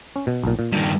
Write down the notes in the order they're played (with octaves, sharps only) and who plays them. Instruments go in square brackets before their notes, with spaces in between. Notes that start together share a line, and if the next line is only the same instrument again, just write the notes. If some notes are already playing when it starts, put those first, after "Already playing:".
[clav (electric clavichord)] C#4
B2
B1 A#2
A#2
[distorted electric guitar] G2 D#3